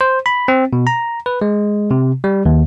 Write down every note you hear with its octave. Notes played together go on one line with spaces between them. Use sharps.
C5
B5
C4
B2
A#5
B4
G#3
C3
G3
D#2